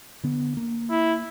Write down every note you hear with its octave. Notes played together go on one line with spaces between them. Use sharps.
D3 B3
A#3
E4